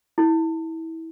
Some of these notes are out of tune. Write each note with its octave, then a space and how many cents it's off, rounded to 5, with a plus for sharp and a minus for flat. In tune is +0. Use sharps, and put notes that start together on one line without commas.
E4 -25